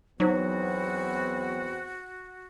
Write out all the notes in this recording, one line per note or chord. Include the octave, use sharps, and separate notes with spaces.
E2 F#3 B3 C4 D#4 F#4 C5